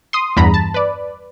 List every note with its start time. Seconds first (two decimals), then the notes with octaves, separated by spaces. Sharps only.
0.13 C6 D#6
0.37 E2 G2 A#5 B5
0.54 A5
0.74 B4 D5